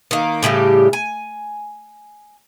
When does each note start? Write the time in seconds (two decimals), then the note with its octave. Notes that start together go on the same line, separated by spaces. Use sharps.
0.11 D#3 A#3
0.43 A2 C#3 G3 G4
0.93 G#5